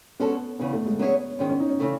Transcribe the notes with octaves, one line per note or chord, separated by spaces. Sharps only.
G#3 B3 C#4 F#4 A4
E2 C#3 E3 B3
A3
G#3
F#3 B3 C#4 G#4 C#5 E5
G#2 D#3 G#3 C#4
C#4
D#4
C#4
C#3 E3 A3